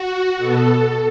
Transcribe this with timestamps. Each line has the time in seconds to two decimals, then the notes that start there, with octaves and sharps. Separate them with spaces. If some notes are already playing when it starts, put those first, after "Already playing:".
Already playing: F#4
0.37 B2 B3 A4